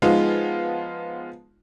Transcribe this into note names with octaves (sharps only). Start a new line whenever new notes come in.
F3 G#3 B3 D#4 F4